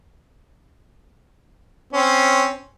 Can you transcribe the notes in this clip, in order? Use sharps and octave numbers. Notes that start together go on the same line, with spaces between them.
C4 C#4